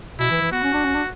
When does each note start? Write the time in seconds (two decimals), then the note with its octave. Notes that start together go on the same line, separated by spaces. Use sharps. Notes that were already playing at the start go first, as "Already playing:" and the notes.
0.19 B2 E4
0.30 E3
0.41 E3
0.52 B3 F#4
0.63 C#4
0.73 D4
0.84 C#4
0.95 D4